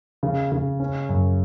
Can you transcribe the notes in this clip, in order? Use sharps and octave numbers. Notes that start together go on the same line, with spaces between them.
C#3
C#3
C#4
F#2